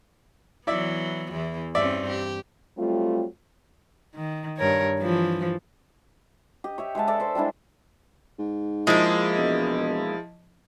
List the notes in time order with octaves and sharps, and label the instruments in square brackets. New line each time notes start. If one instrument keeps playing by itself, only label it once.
[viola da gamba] E3 F#3 B3 [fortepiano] E4 D5 E5
[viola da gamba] E2 E3
[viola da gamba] G2 C4 C#4 [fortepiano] D5 E5
[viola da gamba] G4
[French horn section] F#3 G3 A3 C4 F4
[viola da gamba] D#3
G2 A#4 C#5
E3 F3
[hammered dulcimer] G4 D#5
C#5 E5 G5
G#3 B4 E5 A5
A4 D5 E5 A5
C5 E5
G3 G#3 D4 E4
[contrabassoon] G#2
[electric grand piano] F3 E4 D#5 [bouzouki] G#3 A#3
[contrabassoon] E1